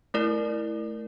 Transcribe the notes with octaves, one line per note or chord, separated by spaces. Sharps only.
A3 E4 A#4 D5